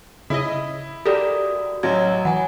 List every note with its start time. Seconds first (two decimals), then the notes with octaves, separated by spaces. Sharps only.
0.30 C#3 E4 D#5
1.06 F#4 G4 A4 A#4 D5 D#6
1.83 A1 F#3 D#5 G#6
2.25 E3 F#5 G#5